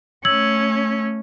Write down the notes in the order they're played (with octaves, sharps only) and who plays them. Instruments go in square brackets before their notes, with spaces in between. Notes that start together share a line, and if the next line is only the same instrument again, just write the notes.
[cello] A3 C#4 [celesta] E6 G#6 F#7